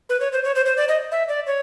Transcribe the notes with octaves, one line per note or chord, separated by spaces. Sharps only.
B4
C#5
C5
C#5
C5
C5
D5
D#5
E5
D5
C#5